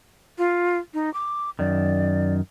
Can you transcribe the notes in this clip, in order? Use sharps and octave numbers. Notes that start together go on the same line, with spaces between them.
F4
D#4
D6
F#2 D#3 D5